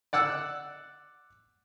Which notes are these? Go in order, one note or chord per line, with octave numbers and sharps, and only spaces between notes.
D5 F#5 E6 F#6